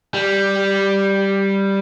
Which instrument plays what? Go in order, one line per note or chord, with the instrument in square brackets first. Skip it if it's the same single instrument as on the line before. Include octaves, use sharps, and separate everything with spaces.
[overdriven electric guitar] G3